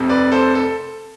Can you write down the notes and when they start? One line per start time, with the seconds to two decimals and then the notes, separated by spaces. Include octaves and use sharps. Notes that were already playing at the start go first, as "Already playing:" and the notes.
Already playing: F1 F2 C3
0.09 B4 D5
0.32 A4 C5
0.55 A4